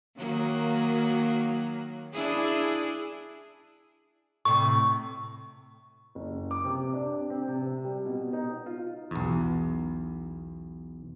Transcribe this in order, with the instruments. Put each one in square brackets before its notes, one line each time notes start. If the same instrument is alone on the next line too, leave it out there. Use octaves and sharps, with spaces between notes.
[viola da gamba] D#3 F#3 A#3
D4 E4 G#4
[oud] A2 C3 [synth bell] C#6
[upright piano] F#1
D6
C3
D4
C4
C3
G3
B2
D#4
F4
[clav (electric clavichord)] B1 E2